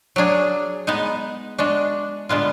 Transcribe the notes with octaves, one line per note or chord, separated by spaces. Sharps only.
F#3 D4 G#4
G#3 B3 D#4
G#3 D4 F#4
D3 G#3 B3 F4